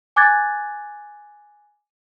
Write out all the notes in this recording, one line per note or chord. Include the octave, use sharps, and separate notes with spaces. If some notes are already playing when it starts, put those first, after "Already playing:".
G#5 D6 F#6 G#6 A6